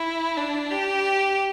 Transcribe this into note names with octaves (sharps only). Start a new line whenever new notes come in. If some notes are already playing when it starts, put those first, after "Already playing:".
Already playing: E4
D4
G4